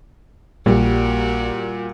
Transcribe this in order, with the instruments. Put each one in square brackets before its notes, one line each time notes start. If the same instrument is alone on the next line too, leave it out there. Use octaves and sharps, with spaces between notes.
[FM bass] A#1 [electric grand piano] A#2 [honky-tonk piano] G3 [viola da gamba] A#3 F#4 A#4